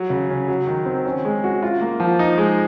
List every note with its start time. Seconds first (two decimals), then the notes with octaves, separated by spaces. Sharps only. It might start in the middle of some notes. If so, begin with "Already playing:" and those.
Already playing: F#3
0.10 C#3
0.30 C#4
0.48 F#3
0.67 D#3
0.86 C4
1.06 C#4
1.25 G#3
1.44 F#4
1.63 F4
1.81 A#3
2.00 F3
2.19 D#4
2.38 G#3